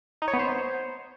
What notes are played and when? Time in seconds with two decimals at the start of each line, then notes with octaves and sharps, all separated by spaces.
0.22 D#4
0.28 C#5
0.33 B3
0.39 C5